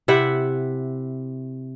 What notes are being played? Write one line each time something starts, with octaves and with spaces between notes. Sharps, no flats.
C3 E4 E5 F#5